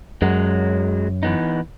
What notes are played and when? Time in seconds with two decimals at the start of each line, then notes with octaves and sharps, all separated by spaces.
0.22 F#2 F#3 G#3
1.23 E3 B3 D#4